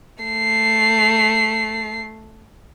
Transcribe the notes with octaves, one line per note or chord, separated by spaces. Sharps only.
A3 C7